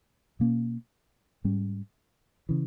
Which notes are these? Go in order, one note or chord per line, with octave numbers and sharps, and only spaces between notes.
B2 A#3 C#4
G#2 G3 C#4
C#3 E3